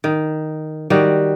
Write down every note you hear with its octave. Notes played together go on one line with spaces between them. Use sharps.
D#3
D#3 G3 F#4